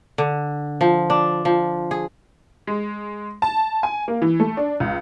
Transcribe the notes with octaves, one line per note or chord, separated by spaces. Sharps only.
D3
F3
D4
F3
G#4
G#3
A5
G#5
A#3
E3
A3
D4
C#2